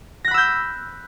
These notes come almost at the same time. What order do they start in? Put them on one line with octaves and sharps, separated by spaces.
A#6 F#6 B5 E6 G6